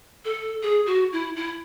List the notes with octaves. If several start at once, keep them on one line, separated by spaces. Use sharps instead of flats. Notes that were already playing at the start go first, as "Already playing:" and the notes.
A4
G#4
F#4
E4
E4